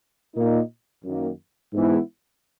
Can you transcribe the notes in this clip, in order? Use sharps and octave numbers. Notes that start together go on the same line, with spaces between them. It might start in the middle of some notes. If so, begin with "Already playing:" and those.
A#2 A#3 D#4
F#2 D#3 A#3
G#2 E3 B3 E4